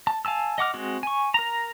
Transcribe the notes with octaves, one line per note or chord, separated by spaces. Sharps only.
A5
F5 G#5 A5 E6
D#5 F#5 D6 F6
G#3 C4 F#4
G#5 C#6
A#4 A#5